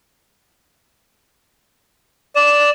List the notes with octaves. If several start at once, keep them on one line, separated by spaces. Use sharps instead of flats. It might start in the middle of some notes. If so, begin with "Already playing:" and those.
D5 E7